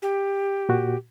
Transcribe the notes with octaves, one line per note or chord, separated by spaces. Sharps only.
G4
A#2 F#4